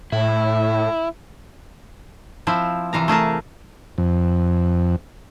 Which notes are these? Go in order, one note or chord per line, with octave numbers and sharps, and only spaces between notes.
A2 E4
F3 C4 E4
C3 E3 F5 A#5
A3 G#4 A#4 A5
F2